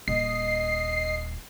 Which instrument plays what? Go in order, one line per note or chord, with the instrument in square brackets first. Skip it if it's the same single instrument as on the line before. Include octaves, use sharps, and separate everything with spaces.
[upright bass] D#1 [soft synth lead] D#5 [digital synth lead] C7